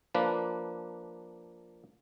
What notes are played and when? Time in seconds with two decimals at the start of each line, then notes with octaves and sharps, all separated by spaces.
0.15 F3 A#3 D4 B4